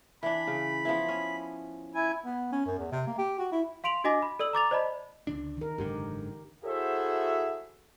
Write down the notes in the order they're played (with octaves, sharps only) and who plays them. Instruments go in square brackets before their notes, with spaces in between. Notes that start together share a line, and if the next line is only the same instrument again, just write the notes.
[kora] E3 D4 [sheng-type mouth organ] B5
[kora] C#3
F3 B3 E4
C#4
[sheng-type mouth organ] E4 G#5
[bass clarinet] B3
C#4
F#2
E2
C3
A#3
G4
F#4
E4
[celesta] F5 C6 D7 F7 F#7
D4 F#4 D#5 G#5 D6 A#6
B5
A4 D5 E6 F#7
A#5 D6 A6 F7
C5 D5 D#5 A5 B5
[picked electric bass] C#2 D3 D4
[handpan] D#3 A#4
[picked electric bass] F#1 G#2 D3 [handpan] G4
[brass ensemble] E4 F#4 G#4 A4 C5 E5